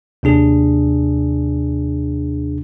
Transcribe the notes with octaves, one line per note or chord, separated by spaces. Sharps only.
D#2 C3 D4 G#4